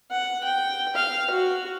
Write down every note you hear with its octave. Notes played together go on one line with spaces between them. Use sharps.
F#5
G5
F5
F#4